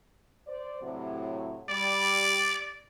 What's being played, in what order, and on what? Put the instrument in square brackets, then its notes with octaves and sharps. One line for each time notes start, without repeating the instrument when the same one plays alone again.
[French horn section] C5 D5
A2 C3 F#3
[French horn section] G3 [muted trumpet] D5